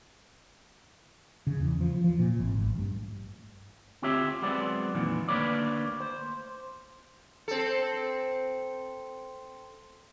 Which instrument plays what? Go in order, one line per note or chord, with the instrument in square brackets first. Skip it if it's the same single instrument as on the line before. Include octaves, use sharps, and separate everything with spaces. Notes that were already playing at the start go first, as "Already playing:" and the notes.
[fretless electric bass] C#3
E2
F3
F3
A#2
G#1
A1
G2
[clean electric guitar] D2 C4 F4 G4 C#5 E5
F#3 G#3 B3 C4 D5
F2 A#2 D#3 E3
D2 C#3 A#3 B4 C#5 D5
C5
[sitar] C4 A4